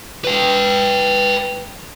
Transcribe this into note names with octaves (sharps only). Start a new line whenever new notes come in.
B4 G5